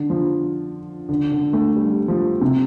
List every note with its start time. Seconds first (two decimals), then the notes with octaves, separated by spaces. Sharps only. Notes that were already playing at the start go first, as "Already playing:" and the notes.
Already playing: D3
0.10 F3
1.09 D3
1.31 D3
1.53 A3
1.76 G3
2.08 F3
2.41 C3